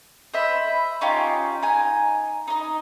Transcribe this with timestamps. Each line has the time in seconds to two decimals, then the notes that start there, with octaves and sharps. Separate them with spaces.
0.34 C5 D#5 E5 B5
1.01 C#4 D#4 F4 G4
1.62 D#4 G#5
2.48 D#4 D#5